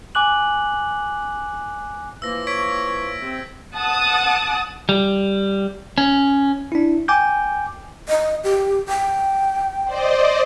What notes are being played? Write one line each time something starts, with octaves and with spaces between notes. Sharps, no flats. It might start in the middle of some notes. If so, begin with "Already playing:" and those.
G#5 D6 F#6 F#7
E3 F3 A#3 E6 A#6
C#5 G#6 B6 D7
C3 C4
F#5 A5 D#6
G3
C#4
D4 E4
G5 G#5 D6 G6
D#5
G4
G5
C5 D5 D#5